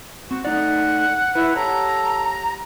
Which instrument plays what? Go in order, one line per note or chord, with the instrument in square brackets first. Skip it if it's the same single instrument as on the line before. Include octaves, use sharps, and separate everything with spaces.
[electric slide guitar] C4 [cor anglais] F#4
[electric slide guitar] A3 D#4 D5 [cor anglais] F#5
[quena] E4 [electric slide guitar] B4
[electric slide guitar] G4 C#5 F#5 [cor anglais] A4 [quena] A#5